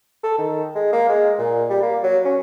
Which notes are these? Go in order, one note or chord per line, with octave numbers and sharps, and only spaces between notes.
A4
D#3
G#3
A#3
G#3
A#2
G3
A#3
F#3
C#4